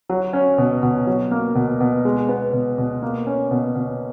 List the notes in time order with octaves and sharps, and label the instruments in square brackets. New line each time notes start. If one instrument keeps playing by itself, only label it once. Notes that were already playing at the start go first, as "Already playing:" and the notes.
[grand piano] F#3
C#4
B2
B2
F#3
A#3
B2
B2
G#3
B3
B2
B2
A#3
C#4
B2
B2